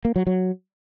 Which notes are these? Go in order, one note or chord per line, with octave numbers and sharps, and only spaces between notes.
A#3
F#3
F#3